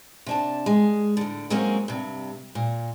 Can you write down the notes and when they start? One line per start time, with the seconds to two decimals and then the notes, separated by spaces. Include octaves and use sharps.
0.26 C3 D4 A5
0.66 G#3
1.17 A2 D3
1.50 F#3 G#3 A#3 C4 C#4
1.88 G2 C3
2.55 A#2